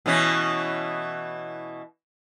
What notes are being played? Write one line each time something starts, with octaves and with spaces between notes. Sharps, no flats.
B2 E3 C#4